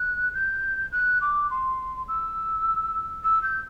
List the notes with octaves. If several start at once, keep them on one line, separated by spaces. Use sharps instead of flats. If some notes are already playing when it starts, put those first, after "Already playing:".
Already playing: F#6
G6
F#6
D6
C6
E6
E6
G6